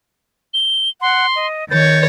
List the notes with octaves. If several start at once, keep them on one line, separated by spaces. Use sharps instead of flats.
G7
F#5 C6
D#5
D#3 C#5 G6 A6